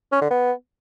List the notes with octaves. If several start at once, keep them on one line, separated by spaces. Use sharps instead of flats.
C#4
D3
B3